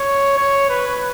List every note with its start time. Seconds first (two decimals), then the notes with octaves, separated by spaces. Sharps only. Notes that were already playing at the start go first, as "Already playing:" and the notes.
Already playing: C#5
0.38 C#5
0.70 B4